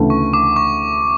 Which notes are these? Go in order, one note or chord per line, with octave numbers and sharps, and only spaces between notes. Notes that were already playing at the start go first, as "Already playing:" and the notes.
Already playing: D2 C#3 E3 A3
C#6
D6
C#6